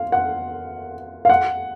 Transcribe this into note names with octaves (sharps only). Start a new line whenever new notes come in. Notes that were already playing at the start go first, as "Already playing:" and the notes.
Already playing: F5
F#5
F5
F#5